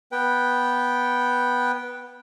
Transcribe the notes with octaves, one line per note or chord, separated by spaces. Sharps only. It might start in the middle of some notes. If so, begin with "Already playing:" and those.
B3 B4 G5